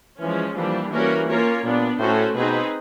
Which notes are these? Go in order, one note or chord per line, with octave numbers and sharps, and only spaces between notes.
E3 F3 G#3 C#4
E3 F3 G3 A#3 D4 G4
E3 G3 A#3 C#4 F#4 A#4
A#3 C#4 F4 A#4 C#5
A#2 G3 B3 D4
A2 A3 C#4 F#4 A4 C5
B2 C4 D#4 G#4 B4